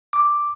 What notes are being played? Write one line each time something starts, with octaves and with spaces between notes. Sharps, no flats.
D6